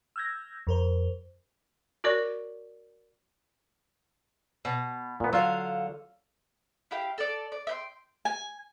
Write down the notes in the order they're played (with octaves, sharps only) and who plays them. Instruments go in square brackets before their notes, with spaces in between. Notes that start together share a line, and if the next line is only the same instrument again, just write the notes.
[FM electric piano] E6 F6 G6 G#6 A#6
F2 A#4 C5
[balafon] F#4 A#4 C#5 D5 C#6
[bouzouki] B2
[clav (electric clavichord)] A#2 B3
[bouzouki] D3 F5 [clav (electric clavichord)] F#3 F4
[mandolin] E4 G4 F5 G5
A4 D5
D5
E5 G5 C6
[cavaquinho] G#5